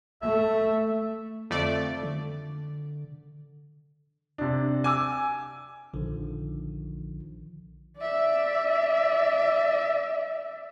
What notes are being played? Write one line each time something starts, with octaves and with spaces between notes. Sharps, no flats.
A3 E5
F2 D3 A3 D5
D3
C3 D4
G#5 D6 E6
A#1 D3 D#3 F3
D5 E5